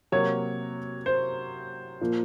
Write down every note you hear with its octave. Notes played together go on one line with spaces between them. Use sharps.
C3 F#3 A#3 C#5
C5
A#2 F3 A#3